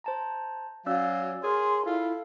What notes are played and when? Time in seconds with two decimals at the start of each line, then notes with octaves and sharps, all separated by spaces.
0.04 C5 A5 A#5
0.86 F#3 C#4 D5 F5 E6
1.43 G#4 A#4 C#5 C6
1.86 E4 F4 A4 F5